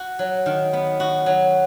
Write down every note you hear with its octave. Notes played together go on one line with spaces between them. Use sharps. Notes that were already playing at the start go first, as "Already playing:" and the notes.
Already playing: F#4
F#3
D#3
B3
F#4
F#3